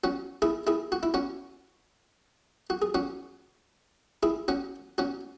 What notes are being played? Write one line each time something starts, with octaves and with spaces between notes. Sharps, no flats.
C#4 F#4
E4 G#4
E4 G#4
F#4
E4
C#4 F#4
F#4
G#4
C#4 F#4
E4 G#4
C#4 F#4
C#4 F#4